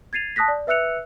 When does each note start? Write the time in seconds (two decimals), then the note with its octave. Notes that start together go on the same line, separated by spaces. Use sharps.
0.13 G#6 A6 C7 D#7 F7
0.36 A5 D#6 F#6 A#6 B6
0.48 D5
0.67 B4 E5 E6 F#6 C#7 F7